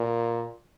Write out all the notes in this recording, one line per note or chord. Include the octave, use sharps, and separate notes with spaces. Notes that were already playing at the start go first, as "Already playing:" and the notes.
Already playing: A#2